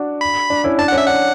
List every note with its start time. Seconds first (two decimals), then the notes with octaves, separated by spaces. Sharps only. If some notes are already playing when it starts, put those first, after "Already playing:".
Already playing: D4 F#4
0.21 B5
0.50 D4
0.64 C#4 E4
0.78 D4 A5
0.88 F#5
0.92 C#4
0.98 E5
1.07 D4 F#5